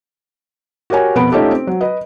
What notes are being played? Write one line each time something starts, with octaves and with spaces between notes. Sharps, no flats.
F#4 G4 A#4 C#5 G#5
F2 B2 B3 B5 D7
A3 C#4 D#4 F4 G4 A4
C4
F#3
B4 D#5